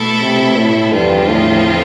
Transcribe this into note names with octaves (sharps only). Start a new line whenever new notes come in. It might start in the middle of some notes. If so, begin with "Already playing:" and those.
Already playing: B2 A3 E4 A4
C3
A2
E2 G2 D3 F3 C4 F4
A2